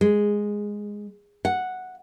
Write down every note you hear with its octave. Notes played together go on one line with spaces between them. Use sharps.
G#3
F#5